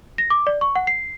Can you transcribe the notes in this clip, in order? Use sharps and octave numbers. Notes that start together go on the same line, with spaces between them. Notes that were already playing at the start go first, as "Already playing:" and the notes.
A#6
D6
D5
C#6
F#5
C7